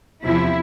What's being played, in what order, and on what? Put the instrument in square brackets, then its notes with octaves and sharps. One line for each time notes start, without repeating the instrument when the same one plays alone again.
[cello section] E2 C3 F3 E4